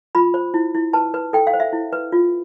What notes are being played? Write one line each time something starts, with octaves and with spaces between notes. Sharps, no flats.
F4 B5
C5
E4
E4
B4 A5
B4
A4 G5
F5
C5
E5
E4
B4
F4